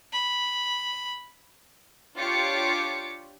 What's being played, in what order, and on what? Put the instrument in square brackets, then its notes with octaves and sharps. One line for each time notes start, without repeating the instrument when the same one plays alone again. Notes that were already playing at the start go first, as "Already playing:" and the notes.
[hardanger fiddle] B5
[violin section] D4 F4 G4 C#5 D6 C#7